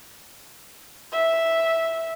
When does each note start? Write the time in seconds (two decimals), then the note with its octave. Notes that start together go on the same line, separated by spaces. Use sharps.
1.12 E5